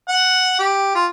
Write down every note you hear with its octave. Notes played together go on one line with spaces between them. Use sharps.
F#5
G4
F4